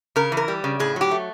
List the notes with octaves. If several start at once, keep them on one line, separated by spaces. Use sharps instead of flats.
C#3 A#4
E3
A#4
G3
C#3
A2 G#4
F#3 G4
A3